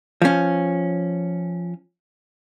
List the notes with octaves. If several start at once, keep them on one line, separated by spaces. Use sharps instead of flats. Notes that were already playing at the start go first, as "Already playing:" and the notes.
F3 C#4